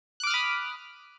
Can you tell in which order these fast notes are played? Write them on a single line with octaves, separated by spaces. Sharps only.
F#6 D6 F6 D#6 B5